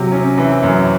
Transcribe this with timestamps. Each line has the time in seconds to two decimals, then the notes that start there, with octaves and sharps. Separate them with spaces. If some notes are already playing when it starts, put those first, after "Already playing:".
Already playing: C3 F#3
0.12 C#4
0.38 E3
0.63 F#2